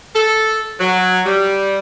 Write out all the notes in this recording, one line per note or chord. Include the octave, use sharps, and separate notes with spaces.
A4
F#3
G3